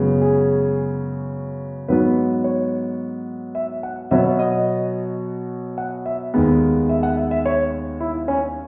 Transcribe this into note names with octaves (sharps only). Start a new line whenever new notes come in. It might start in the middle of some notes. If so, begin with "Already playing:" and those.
Already playing: F#2 C#3 G#3 B3
G#4
G#2 F#3 B3 B4
C#5
E5
F#5
B2 F#3 B3 E5
D#5
F#5
E5
D#2 D#3 G#3 B3
E5
F#5
E5
E5
C#5
E4
C#4